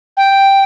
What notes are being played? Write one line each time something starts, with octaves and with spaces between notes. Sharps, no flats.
G5